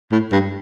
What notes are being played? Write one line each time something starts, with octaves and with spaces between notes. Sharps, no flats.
A2
G2